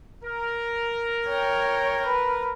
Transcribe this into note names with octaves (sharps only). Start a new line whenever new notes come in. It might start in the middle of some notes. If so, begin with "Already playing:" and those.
A#4
C#5 G5
B4